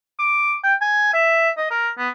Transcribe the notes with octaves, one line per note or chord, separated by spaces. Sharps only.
D6
G5
G#5
E5
D#5
A#4
B3